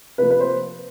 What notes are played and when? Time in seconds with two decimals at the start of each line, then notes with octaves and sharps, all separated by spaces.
0.18 C3 F3 A#3 B4
0.30 B4
0.40 C5